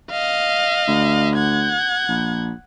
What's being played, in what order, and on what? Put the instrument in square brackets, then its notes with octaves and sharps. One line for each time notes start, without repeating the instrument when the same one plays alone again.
[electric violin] D#5 F5
[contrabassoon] D2
[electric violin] F#5 G#6
[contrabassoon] A#1